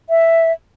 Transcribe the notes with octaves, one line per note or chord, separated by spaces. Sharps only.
E5